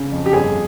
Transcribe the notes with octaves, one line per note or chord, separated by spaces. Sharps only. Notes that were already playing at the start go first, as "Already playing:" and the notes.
Already playing: C#3
F2
G4
G1 G#4